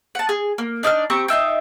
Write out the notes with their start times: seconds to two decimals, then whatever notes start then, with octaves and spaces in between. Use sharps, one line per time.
0.15 F#5 A5
0.29 G#4
0.58 A#3
0.83 D4 D#4 D5 F6
1.10 C4 G4 A#5 C#6
1.28 D#4 F4 E5 G5